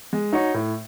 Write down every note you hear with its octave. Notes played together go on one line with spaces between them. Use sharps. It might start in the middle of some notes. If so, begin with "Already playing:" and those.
G#3
D#4 F#4 C#5
A2